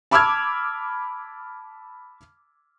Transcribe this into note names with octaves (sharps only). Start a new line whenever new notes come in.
A5 B5 D6 E6 F6 G#6